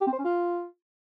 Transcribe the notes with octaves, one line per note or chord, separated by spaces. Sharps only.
G4
C4
C5
C#4
F4